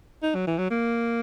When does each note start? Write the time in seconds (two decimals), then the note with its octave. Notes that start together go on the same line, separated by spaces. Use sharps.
0.22 D#4
0.35 F#3
0.47 E3
0.58 F#3
0.70 A#3